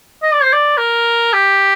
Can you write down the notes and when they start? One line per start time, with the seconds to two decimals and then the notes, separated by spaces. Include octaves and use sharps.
0.23 D#5
0.33 D5
0.43 C5
0.53 D5
0.78 A#4
1.33 G4